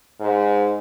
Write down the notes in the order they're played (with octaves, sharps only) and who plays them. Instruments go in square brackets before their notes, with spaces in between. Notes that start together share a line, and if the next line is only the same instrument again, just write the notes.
[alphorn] G#2